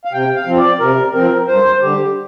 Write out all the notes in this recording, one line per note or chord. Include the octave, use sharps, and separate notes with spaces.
F5
C3 G5
F5
F3 C4
D5
C3 A#4
F3 C4 A#4
G2 C5
D3 G3 G4